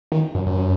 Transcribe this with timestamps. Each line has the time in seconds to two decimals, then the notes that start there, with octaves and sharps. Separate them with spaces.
0.12 D#3
0.35 F#2
0.47 F#2